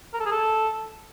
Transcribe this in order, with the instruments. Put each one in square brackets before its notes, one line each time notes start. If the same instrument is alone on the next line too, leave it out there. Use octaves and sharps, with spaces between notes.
[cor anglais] A#4
A4
G#4
A4